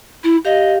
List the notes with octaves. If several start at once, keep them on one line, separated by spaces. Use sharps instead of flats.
E4
G4 D#5 F5